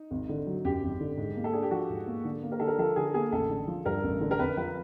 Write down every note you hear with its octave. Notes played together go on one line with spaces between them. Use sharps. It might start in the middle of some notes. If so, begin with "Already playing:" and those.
Already playing: D#4
G#1
D3
F#3
F#2 G4
G#1
D3
G#2
A#3
A4
D4 G#4
G4
F3 F#4
G#2
A#3
D3
A#3
A#4
D3 A4
A#4
F3 A4
D3 G#4
A#3 G#4
A1 A4
D3
F3
G2 A#4
A1
D3
A#4
F2 B4
F3 B4